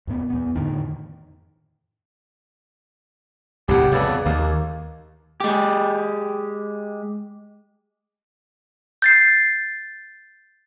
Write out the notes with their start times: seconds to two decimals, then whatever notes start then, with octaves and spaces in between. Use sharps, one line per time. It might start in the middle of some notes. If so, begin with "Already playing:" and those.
0.07 F2 A#2 B3
0.30 E2 B3
0.55 F2 A2 D3 D#3
3.68 C2 A2 C3 G4 F#5
3.92 F2 C#3 B3 D4
4.26 D#2 A#3
5.40 G#3 G4
9.02 G6 A6 C7